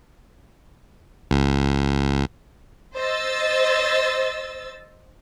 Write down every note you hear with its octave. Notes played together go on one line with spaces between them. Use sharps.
C#2
C5 D#5 E6 A6